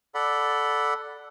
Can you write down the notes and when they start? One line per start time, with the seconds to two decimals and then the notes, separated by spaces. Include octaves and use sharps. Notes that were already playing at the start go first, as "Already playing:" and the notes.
0.15 A4 D5 F#5 B5